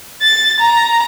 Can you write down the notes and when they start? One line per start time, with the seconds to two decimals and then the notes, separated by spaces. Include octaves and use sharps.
0.22 A6
0.60 A#5